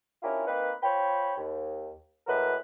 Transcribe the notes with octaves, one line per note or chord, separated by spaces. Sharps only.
C#4 D4 E4 F4 G4 A#4
A#3 C4 D#4 B4
F4 C5 C#5 G5 B5
D#2
A2 G#3 F#4 A#4 B4